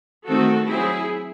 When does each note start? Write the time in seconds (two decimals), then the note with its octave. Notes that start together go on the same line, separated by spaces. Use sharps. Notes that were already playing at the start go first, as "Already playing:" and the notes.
0.27 D#3 A3 C4 F#4 A4
0.67 F#3 C4 E4 G#4